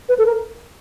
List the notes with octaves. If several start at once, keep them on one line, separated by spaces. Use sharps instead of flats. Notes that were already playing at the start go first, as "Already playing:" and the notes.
B4
A4
A#4